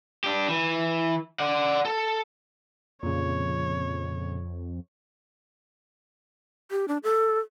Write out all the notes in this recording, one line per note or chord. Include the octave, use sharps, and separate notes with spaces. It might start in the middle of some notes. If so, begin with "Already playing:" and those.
D4 G4
E3
D5 F#5
A4
F2 A#2 C#3 C#5
G4
D4
A4